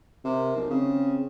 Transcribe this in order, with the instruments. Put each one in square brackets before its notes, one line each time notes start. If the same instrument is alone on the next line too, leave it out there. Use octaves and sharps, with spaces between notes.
[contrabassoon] C3 [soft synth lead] A#4
[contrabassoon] B1
[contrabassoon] C#3 [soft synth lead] C4